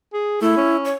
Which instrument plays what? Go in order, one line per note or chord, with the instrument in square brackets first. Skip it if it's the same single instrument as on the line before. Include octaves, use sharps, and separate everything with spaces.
[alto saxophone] G#4
[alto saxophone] A3 [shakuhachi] E4
[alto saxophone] C#4
[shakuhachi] C#5